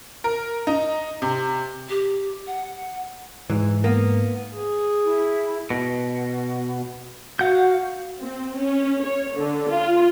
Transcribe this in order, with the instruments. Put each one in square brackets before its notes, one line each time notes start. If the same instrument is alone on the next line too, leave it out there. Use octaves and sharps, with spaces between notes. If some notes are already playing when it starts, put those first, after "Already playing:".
[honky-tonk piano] A#4
D#4
C3
[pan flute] G4
F#5
[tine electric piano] G#2 [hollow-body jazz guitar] E3
[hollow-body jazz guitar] A#3 B3
[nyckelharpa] G#4
[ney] E4
[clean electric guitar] B2
[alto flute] F#4 [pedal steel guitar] F5 F#5 G6
[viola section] C4
C#4
C#5
D3
F4